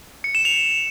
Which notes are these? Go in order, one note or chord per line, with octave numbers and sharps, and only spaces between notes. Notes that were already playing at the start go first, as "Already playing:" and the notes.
C#7
E7
F7